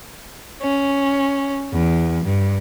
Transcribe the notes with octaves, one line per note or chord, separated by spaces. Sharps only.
C#4
E2
G2